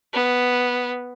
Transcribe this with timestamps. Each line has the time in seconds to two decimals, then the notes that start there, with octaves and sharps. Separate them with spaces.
0.13 B3